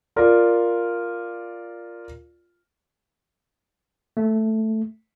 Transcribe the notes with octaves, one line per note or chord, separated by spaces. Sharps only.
F4 A#4 D5
A3